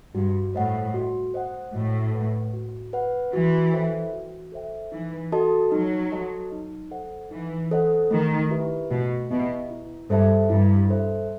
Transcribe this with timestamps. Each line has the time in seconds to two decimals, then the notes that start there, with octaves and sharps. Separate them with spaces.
0.15 G2 F#4
0.54 A2 C5 D#5 F#5
0.94 F#4
1.34 C5 D#5 F#5
1.74 A2 F#4
2.14 B4 F#5
2.53 F#4
2.93 B4 F#5
3.33 E3 F#4
3.73 A4 C5 E5 G5
4.13 F#4
4.52 A4 C5 E5 G5
4.92 E3 D#4
5.32 F#4 A4 D#5 A5
5.72 F#3 D#4
6.12 F#4 A4 D#5 A5
6.52 D#4
6.91 A4 C5 D#5 F#5
7.31 E3 D#4
7.71 A4 C5 D#5 F#5
8.11 D#3 A3
8.50 E4 G4 B4 E5
8.90 B2 A3
9.30 B2 E4 G4 B4 E5
9.70 E4
10.10 G2 A4 C5 E5 A5
10.50 G2 E4
10.89 A4 C5 E5 A5